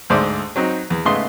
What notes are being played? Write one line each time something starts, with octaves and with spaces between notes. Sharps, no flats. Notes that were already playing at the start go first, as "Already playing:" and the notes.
D2 G#2 C5 D5 E5 D#6
F#3 C4 D#4
E2
G#2 C#3 A3 B3 D#5 C6